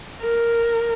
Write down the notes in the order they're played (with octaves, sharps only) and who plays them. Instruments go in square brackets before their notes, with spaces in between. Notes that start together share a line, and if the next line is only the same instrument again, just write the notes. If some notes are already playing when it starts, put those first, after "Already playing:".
[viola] A#4